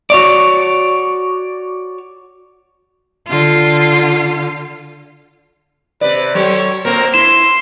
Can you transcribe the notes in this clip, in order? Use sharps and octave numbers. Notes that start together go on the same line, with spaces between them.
F#4 C#5 D5
D3 F4
C3 B4 D5
F#3 A4 C#5
A#2 A#3 C4 A#4
E4 C6 E7